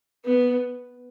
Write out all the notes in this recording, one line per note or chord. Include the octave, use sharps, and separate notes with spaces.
B3